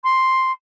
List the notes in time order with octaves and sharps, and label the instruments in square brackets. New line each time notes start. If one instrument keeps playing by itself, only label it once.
[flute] C6